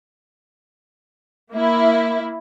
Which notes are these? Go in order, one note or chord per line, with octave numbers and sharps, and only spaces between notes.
A#3 E4